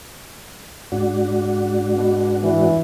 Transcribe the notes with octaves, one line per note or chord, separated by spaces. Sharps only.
G#2 D4 F#4
B2
E3